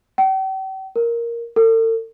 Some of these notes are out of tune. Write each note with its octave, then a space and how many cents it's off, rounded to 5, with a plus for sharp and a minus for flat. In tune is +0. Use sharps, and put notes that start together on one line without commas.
G5 -45
A#4 +0
A4 +45